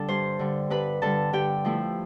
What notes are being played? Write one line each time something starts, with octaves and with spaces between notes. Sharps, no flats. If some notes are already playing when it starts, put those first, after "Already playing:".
Already playing: D3 G3 D4 A4 A5
G2 C5 C6
D3 G3
G2 B4 B5
D3 G3 A4 A5
D3 G4 G5
F3 A3 E4